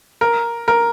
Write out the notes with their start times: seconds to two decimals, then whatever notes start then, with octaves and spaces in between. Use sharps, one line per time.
0.21 A#4
0.68 A#4